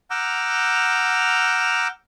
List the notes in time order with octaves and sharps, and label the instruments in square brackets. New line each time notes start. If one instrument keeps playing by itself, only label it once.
[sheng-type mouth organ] F#5 A#5 D6 E6 F6 G6